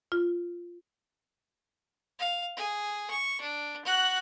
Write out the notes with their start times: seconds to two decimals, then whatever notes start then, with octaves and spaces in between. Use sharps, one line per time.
0.12 F4
2.19 F5
2.57 G#4
3.10 C#6
3.41 D4
3.85 F#4 F#6